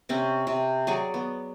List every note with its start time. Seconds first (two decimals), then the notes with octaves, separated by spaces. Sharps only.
0.09 C3 C4 C#4
0.47 C3
0.87 F#3 G#4 D5 C#6
1.14 B3